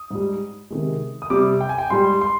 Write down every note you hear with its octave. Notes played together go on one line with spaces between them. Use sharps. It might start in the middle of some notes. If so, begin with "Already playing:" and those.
Already playing: D#6
G#2 G3
C3 D#3 G#3
D#6
C3 G3 D6
G5
G#5
G5
G#2 G3 C6
C6